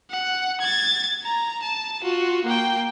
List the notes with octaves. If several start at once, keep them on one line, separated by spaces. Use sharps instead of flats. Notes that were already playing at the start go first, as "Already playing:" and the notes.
F#5
G#6 A6
A#5
A5
F4 F#4
A#3 G5